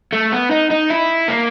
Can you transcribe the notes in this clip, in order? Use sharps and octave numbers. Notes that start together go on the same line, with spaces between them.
A3
B3
D#4
D#4
E4
A#3